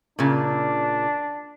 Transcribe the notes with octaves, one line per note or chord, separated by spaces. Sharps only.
A#2 C#3 D4